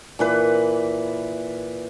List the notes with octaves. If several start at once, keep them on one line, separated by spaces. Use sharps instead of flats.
A#2 E3 B4